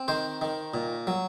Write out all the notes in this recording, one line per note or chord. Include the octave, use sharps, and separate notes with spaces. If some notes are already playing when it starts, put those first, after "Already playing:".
Already playing: C4
D#3 C5
D#3
A#2
F#3